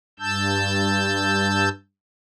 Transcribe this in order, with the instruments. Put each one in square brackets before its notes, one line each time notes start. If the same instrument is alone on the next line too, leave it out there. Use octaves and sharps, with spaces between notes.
[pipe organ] G2 A5 E6 G6